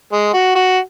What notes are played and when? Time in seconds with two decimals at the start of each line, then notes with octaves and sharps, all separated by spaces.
0.12 G#3
0.33 F#4
0.55 F#4